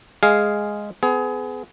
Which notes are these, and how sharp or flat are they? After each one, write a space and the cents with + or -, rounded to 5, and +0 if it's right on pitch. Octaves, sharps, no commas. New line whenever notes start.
G#3 +0 G#4 +0 F5 +0
B3 +35 G#4 +25